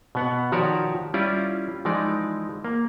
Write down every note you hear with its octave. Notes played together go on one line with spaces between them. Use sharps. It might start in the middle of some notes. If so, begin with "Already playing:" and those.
B2 B3 F#5
D#3 F3 F#4 G4 C#5 D5
G3 C#4 E4 F4 D5
E3 F3 G#3 D#4 D5
A#3